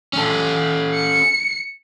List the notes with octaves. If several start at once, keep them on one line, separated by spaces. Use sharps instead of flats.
C#4 A4
C#7